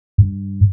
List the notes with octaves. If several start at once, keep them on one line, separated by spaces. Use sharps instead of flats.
G2